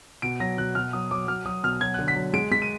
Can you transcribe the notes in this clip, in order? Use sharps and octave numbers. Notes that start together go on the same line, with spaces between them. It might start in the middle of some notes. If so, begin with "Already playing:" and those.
B2 D7
F#3 A#6
B2 F#6
B2 F6
F#3 D#6
F#3 D6
F#3 F6
F#3 D#6
B2 F6
F#3 G#6
D3 F#6
B6
F#3
G#3 D7
G#3 B6
D#7